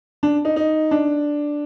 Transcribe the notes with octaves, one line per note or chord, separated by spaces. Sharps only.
D4
D#4
D#4
D4